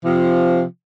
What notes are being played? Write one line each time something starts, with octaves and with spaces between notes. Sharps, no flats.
C3 F3